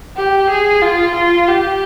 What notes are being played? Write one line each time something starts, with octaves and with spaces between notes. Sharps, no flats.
G4
G#4
F4
F4
G4